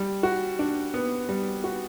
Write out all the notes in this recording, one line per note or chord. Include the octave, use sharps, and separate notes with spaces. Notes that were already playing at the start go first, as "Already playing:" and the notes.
Already playing: G3
F#4
D4
B3
G3
F#4